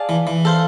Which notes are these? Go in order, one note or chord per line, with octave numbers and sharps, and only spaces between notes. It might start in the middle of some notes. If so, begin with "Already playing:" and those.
Already playing: G#4 D5 F5 A5
E3
E3
A4 C5 F5